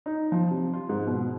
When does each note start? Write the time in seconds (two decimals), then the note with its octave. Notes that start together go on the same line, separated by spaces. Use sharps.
0.06 D#4
0.32 F3
0.51 C3
0.73 F4
0.89 G#2
1.07 B2